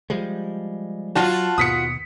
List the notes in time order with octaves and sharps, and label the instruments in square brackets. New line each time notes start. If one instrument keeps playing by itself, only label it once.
[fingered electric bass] F3 G3 G#3
[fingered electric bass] F#3 [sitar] F4 F#4 [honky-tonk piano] A5
[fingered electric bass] D#2 B2 [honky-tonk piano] D#6 B6 C#7